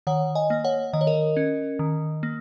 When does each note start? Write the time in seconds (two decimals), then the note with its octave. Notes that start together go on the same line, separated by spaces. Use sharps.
0.07 D#3 C#5 F#5
0.35 D#5 G#5
0.50 A#3
0.64 C#5 F#5
0.93 D#3 D#5
1.01 C#5
1.07 A#4 D#5
1.37 C#4
1.79 D#3
2.23 A#3